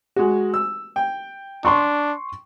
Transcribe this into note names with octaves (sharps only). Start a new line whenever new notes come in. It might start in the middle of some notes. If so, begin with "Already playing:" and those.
G#3 F#4
E6
G5
D4 C6 C#6